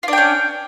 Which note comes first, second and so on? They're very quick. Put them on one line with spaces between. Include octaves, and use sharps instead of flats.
F4 D4 G5 C#4